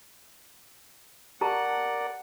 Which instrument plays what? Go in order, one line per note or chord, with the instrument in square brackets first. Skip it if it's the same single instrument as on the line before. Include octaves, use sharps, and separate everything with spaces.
[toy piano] G4 A5 A#5 [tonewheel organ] A#4 D5 [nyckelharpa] F#5